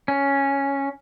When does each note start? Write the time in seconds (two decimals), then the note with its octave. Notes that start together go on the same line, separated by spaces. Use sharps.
0.08 C#4